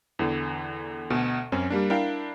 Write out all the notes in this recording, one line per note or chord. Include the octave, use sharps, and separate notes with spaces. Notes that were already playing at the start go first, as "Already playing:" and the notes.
E2 D3 E3
D2 B2
F#2 C4 C#4
G3 A#3 D4
D4 E4 A#4 F5 G5